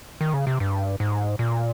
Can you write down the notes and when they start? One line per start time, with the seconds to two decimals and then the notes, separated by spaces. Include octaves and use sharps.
0.21 D#3
0.34 C#3
0.47 C3
0.60 G2
1.00 G#2
1.39 A#2